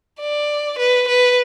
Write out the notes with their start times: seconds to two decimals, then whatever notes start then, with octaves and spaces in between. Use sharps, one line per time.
0.21 D5
0.79 B4
1.08 B4